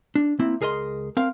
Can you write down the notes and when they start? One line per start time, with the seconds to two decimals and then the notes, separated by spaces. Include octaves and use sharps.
0.15 D4
0.39 A#3 C4 E4
0.61 C#2 G#4 A#4 D#5 C6
1.17 C4 A#4 F5